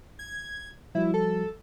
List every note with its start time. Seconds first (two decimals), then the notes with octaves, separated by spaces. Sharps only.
0.19 G#6
0.95 F3 G3 E4 F#4
1.14 A4